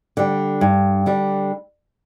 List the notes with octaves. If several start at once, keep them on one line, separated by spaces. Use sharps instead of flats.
D3 G3
G2
D3 G3